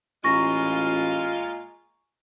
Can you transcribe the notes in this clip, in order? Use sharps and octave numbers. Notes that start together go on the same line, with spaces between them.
A1 A#2 G#3 F4 G#5 A#5 C#6 A#6